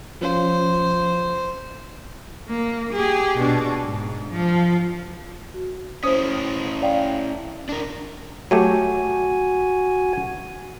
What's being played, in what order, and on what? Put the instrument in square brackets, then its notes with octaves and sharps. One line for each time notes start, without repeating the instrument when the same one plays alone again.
[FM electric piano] F3 C#4 F4 [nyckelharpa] C5
[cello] A#3
G4 G#4
B2 D4
G#2
F3
[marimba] F#4
[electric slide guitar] C#4 E4 [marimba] C5 D#6
[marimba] D5 F5 G5
[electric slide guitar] D4 A#4
[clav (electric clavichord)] F#3 A3 G4 [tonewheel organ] F#4 G#5